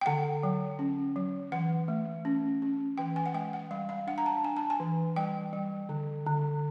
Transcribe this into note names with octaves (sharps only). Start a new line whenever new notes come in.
G5
D3 F#5
F#3
C#4
F#3
E3 F#5
A3
C#4
C#4
E3 G5
G#5
F#5
G#3 G5
F#5
G3 F5
F5
D4 F#5
A#5
A5
D4 G#5
A5
G#5
E3
G3 G5
G3
D3
D3